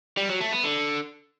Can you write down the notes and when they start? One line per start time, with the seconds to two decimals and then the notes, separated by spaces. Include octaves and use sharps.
0.17 G3
0.29 F#3
0.40 A3
0.52 B3
0.64 D3